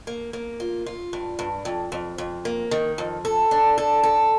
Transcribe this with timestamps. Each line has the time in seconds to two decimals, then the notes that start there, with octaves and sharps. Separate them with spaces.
0.07 A#3
0.33 A#3
0.60 F4
0.86 F4
1.13 G2
1.39 G2
1.65 F2
1.92 F2
2.18 F2
2.45 A#3
2.71 D#3
2.98 F2
3.25 A4
3.51 D4
3.78 A4
4.03 A4